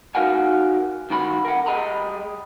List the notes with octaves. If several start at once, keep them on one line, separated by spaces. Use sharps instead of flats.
D#4 F#4 A#4 F5 F#5 G#5
G2 D#3 F#4 B5
A#4 F#5
G3 G#4 D#5 A#5 B5